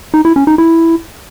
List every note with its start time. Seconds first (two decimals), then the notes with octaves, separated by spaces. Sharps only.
0.14 D#4
0.25 E4
0.36 C#4
0.47 D#4
0.58 E4